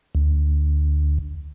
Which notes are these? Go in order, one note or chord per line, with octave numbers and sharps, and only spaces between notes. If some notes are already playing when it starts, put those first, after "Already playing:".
D2